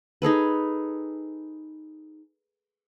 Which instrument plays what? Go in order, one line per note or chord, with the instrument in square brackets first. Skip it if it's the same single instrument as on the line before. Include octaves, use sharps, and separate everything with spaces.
[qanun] D#4 G#4 A4 B4